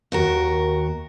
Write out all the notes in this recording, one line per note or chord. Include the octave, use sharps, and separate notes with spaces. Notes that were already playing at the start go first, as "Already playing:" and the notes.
D#2 F#4 A#4